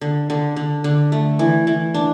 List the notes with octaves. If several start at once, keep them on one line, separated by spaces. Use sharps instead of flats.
D3
D3
D3
D3
A3
E3
E3
D4